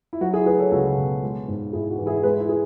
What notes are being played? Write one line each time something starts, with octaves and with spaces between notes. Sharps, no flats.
E4
F#3 F#4
E4 G#4
A3 G#4 B4
A4 C#5
C#2 F#4 A4
B2
G#3
G#2
G#2 E4 G#4
F#4
E3
E4 G#4
G#3 G#4 B4
E4
G#4